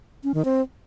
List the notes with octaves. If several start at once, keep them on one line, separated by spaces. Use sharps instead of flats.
C#4
D#3
C4